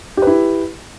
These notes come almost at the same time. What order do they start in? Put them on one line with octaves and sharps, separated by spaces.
G4 B4 E4